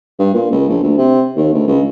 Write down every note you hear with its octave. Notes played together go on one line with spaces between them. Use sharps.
G2
A#2
C#2
A#1
D2
C3
D#2
D2
C#2